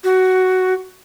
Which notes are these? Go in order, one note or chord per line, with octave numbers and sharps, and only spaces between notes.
F#4